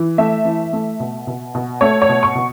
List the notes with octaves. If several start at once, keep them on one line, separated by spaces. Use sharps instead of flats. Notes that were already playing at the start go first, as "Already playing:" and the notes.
Already playing: E3
A3 E5
E3
A3
B2
B2
B2
A3 C#5
C#5
B2
C#6
B2